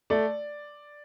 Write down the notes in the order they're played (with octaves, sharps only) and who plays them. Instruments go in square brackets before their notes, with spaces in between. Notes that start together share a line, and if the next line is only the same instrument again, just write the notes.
[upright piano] A3 D5